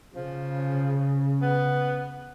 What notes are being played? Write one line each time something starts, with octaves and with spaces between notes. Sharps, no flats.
C#3 F3
B3